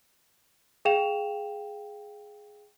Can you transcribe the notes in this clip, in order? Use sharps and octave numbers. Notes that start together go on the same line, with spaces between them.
G#4 F5 G5 E7 F7